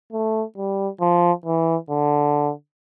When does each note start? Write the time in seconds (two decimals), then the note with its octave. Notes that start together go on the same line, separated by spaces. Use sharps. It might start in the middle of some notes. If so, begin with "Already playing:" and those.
0.12 A3
0.57 G3
1.01 F3
1.45 E3
1.90 D3